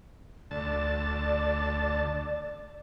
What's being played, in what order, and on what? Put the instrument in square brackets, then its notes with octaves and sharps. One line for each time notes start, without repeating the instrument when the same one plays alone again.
[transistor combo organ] D2 A5 [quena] D5